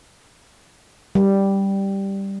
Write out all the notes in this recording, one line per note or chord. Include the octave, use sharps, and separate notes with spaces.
G3